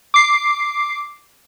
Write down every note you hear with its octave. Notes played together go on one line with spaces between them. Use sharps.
D6 C7